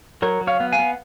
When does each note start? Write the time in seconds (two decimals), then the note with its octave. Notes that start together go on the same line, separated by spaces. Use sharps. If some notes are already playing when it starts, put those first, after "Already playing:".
0.22 F#3 A#4 C#5
0.41 F#3
0.47 C#5 F5
0.60 B3
0.72 F5 G#5
0.79 B3